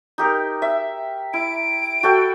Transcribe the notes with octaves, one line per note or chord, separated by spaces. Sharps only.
D#4 G4 A#4
E5
E4 D7
F#4 A4 G5